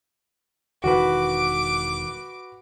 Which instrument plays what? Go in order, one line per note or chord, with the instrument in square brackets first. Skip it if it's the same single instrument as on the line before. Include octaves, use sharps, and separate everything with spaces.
[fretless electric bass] E1 D#3 E3 [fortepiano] F#4 B4 [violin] D6